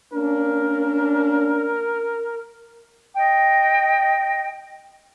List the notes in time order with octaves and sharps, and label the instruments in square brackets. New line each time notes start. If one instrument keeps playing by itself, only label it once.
[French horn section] A#3 C#4 D4 [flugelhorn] A#4
[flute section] D#5 G5